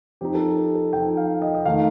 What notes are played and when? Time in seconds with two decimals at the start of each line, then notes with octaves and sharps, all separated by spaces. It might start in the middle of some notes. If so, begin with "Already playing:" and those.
0.21 F3 C4 D#4 G4
0.35 A4
0.39 G4
0.57 A4
0.75 A4
0.93 F3 C4 D#4 G5
1.17 F5
1.42 D#5
1.54 D#5
1.65 D#3 A3 D#4 F5